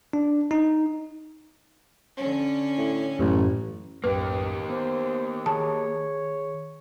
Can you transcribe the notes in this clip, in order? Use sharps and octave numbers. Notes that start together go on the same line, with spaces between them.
D4
D#4
D3 C#4
A2
A1 F#2 A2
B1 F#2 A2 A#3 G4 B4
B3 C5
D#3 G#4 C#5 A5